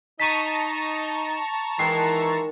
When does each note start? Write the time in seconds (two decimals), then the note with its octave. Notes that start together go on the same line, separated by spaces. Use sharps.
0.20 D#4 D#5 A5 A#5 C#6 B6 D#7
1.79 D#3 E3 G#3 C7